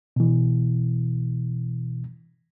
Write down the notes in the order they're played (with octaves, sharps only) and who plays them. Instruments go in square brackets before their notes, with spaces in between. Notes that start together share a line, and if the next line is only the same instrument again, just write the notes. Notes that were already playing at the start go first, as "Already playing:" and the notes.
[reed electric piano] B2 E3